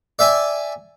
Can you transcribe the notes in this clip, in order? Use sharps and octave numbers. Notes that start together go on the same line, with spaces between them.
D5 E5 G5 G#5